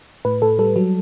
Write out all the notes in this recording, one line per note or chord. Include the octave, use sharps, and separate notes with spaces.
A2 B4
A2 A4
G3 A4
F#3